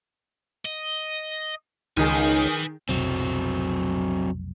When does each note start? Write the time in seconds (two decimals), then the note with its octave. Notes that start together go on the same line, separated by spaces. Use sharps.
0.65 D#5
1.97 C#2 D#3 D#4 G#4 B4 G#5
2.89 F1 B1 F#3 C4